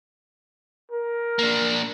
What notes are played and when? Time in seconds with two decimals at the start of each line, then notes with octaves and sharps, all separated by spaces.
0.91 A#4
1.39 A#3 D4